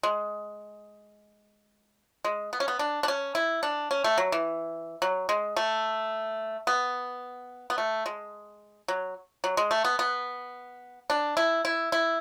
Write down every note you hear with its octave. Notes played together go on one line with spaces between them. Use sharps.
G#3
G#3
B3
C#4
B3
D4
D4
C#4
E4
D4
C#4
A3
F#3
E3
F#3
G#3
A3
B3
B3
A3
G#3
F#3
F#3
G#3
A3
B3
B3
D4
E4
E4
E4